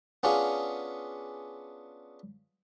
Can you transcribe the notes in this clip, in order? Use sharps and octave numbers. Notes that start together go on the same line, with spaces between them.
B3 C#4 D4 F4 G#4